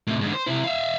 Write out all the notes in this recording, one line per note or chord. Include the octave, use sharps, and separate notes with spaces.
A2 C3
G#2 D3
C5
C3 E4
E5 F5